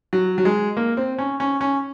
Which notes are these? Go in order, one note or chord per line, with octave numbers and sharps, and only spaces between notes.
F#3
F#3
G#3
A#3
C4
C#4
C#4
C#4